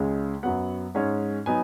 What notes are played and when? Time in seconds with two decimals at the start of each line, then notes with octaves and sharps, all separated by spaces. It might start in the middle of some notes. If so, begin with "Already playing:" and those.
Already playing: C#2 C#3 G#3
0.43 F#2 F#3 B3 F#5
0.95 G#2 G#3 C#4
1.46 F#3 B3 D#4 G#5